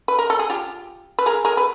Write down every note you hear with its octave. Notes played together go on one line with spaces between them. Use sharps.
B4
A#4
A4
G#4
F4 G4
B4
G#4 A#4
G#4 A#4
B4